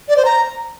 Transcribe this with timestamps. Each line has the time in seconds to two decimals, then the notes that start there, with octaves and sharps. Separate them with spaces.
0.09 D5
0.17 C5
0.25 A#5